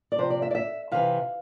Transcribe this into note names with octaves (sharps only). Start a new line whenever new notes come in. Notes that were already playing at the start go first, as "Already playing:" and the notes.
D5
C3 F3 C5
D5
E5
D5
E5
C3 E3 F5